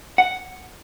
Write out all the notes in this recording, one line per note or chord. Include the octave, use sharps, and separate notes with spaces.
F#5